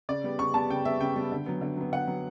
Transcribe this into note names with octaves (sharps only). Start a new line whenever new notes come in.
C#3 D5
G3 B3
C#3 C#6
G3 B3 A5
C#3 G5
G3 B3 E5
C#3 G5
G3 B3
D3
F#3 B3
D3
F#3 B3
D3 F#5
F#3 B3